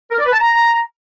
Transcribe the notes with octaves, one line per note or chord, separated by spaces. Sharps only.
A#4
D5
B4
A5
A#5